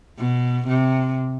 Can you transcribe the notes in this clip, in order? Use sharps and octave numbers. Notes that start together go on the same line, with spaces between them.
B2
C3